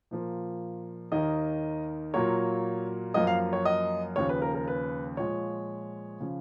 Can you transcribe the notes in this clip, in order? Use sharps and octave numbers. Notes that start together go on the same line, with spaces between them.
A#2 F3 A#3
D#2 D#3 A#3 D#5
A#2 F#3 A#3 C#5
F#2 F3 A#3 D#5
F5
C#5
D#5
D#2 C#3 F3 C#5
B4
A#4
A#4
B4
A#2 F3 G#3 C#5
C#3 F3